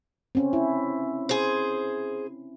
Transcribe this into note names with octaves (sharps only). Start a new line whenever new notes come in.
C4 C#4
E4
G#4 C5